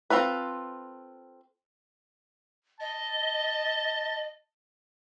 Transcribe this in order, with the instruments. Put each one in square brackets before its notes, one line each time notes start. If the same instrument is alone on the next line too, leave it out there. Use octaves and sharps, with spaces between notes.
[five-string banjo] C4 F4 A4 B4
[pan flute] D#5 [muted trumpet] A5